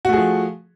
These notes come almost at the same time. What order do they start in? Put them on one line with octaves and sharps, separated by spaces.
F#4 A3 G#4 F3